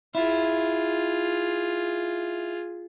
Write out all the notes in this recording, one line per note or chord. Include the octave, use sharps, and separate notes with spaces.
E4 F4 G#4